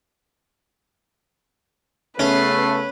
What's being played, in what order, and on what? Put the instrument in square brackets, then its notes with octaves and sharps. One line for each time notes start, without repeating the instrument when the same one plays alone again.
[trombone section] C#3 A3 [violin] B3 C7 [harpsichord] C#4 [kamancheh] B4